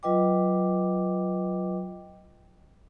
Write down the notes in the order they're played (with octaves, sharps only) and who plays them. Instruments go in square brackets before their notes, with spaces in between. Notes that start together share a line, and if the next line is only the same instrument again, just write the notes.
[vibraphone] F#3 F4 B4 D#5 G5 D6